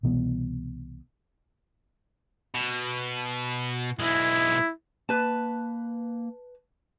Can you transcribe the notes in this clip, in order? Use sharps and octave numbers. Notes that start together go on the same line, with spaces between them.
C2 B2 E3 B3
B2
B1 G#3 E4
A#3 B4 A5